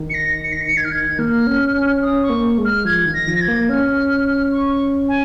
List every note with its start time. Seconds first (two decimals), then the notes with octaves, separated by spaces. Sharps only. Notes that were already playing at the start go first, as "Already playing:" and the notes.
Already playing: D#3
0.09 C#7
0.14 A#6
0.44 C#7
0.52 A#6
0.61 C#7
0.77 G#6
0.84 F6
0.91 G#6
1.19 A#3 F6
1.47 C#4
1.74 C#4
2.01 C#4 D#6
2.23 C#6
2.30 A#3
2.58 G#3
2.65 F6
2.85 F3 G#6
3.06 D#3
3.13 A#6
3.27 F3
3.34 A#6
3.41 G#6
3.48 A#3
3.69 C#4 F6
4.52 C#6
5.08 G#5